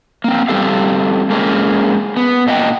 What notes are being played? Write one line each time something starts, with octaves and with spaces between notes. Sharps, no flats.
A#3 C4
G3 C4 G4 A4 F5
G#3 A#3 C4 C#4 G#4
B3
A#2 D4 D#5 E5 F#5 G5